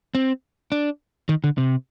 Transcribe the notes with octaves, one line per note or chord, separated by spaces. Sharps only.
C4
D4
D#3
D3
C3